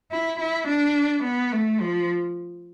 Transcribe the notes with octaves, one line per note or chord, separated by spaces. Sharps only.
E4
E4
D4
B3
A3
F3